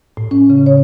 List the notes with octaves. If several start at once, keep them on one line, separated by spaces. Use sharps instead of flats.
A2
C#4
C#3
C#5